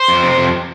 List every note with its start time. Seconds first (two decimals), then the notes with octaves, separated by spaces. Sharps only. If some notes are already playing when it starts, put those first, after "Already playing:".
Already playing: C5
0.08 F2
0.23 C3
0.38 F2